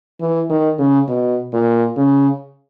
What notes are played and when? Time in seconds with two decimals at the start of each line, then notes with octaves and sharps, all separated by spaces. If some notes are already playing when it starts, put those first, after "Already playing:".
0.21 E3
0.50 D#3
0.79 C#3
1.08 B2
1.53 A#2
1.97 C#3